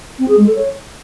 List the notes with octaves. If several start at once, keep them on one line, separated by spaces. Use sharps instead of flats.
C4
G#4
G#3
A4
C#5